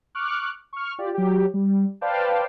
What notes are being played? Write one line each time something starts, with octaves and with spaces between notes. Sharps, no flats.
C#6 D6 F6 F#6
C#6 F6
F4 G4 D5
F#3 G4
G3
B4 C5 D5 F5 G5 A5